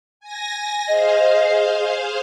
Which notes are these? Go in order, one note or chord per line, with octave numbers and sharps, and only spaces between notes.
G#5 A#6
G#4 C5 D#5 F5